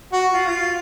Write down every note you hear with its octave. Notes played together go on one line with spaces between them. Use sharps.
F#4
F4
F4